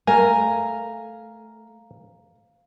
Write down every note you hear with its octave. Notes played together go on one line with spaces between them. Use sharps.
A3 A#4 F5 G#5 A#5